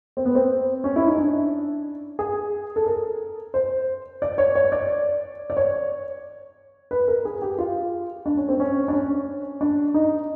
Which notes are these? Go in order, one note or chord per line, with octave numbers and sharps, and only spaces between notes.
C4
B3
C4
C#4
E4
D#4
D4
G#4
A4
A#4
C5
D5
C#5
C#5
D5
D5
C#5
B4
A#4
G#4
G4
F4
D4
C#4
C4
C#4
D4
C#4
D4
D#4